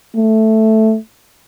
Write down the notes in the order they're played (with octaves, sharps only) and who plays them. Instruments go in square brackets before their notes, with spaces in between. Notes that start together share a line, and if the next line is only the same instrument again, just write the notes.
[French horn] A3